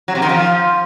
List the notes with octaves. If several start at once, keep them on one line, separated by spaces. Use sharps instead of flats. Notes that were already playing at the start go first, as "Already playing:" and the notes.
F#3
C3
D#3
F3